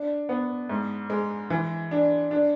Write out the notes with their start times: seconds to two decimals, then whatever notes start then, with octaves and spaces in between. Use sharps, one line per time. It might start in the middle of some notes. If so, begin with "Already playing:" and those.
Already playing: D4
0.29 B3
0.69 G#2
1.10 G#3
1.50 E3
1.91 D4
2.31 D4